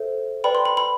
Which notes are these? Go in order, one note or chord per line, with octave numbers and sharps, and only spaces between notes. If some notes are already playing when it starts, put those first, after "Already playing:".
Already playing: A4 C5 E5
B4 D5 G5 B5
C6
B5
B5